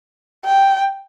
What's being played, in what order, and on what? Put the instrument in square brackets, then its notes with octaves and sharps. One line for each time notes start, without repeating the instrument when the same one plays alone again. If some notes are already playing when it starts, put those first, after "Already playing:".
[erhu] G5